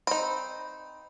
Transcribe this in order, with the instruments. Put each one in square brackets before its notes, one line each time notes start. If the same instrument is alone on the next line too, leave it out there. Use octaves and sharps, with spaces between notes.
[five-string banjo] C4 D#4 [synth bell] B5